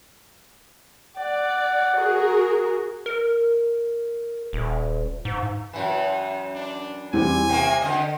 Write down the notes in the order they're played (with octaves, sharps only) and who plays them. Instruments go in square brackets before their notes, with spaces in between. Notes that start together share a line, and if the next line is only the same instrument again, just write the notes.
[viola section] D5 [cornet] F#5
[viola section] F#4 G#4 A#4
[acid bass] A#4
D#1
G#2
[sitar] F#2 E3
[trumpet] D4
[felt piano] E2 G3 C4 [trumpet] G#5
[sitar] C3 A#3 [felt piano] G5
[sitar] D3 F3 D#5